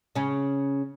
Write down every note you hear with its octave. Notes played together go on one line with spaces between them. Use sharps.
C#3 C#4